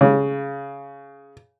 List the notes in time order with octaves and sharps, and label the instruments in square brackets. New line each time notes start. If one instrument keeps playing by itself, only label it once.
[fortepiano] C#3